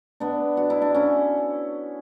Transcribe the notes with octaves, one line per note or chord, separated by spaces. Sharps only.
B3 D4
F#4
E4
D4
C#4 E4